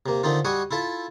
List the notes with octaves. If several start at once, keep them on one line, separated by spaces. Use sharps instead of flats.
C3 A#3
D3 D#3 C4 D#4 F4
G3 F#4 D#5 G#5 C#6
E4 F4 A4 E5